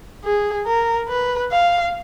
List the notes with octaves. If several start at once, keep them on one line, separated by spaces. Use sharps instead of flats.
G#4
A#4
B4
F5